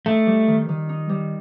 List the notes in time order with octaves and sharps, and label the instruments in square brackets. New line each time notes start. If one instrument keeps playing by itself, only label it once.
[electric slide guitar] A3 [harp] D#4
[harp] G3
D#3
D#3
D#4
G3